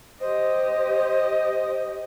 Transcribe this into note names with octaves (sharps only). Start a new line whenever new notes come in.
G4 C5 D#5